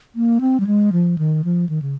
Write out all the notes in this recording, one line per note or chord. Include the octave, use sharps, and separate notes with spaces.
A#3
C4
G3
G#3
F3
D#3
F3
D#3
C#3